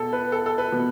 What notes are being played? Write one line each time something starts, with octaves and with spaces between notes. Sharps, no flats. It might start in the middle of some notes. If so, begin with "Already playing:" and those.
Already playing: B2 A4
B4
A4
A4
B4
B2